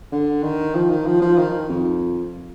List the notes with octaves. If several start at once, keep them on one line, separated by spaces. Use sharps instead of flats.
D3
D#3
F3
D#3
F3
F3
D#3
F2